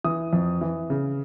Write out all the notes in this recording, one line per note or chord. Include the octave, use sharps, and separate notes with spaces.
E3 D#6
F2
E3
C#3